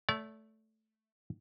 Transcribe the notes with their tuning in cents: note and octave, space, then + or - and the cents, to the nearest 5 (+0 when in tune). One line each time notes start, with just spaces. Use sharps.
A3 -5 D5 -40